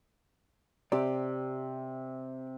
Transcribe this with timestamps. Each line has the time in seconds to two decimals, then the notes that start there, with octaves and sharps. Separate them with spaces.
0.92 C3 G4 D5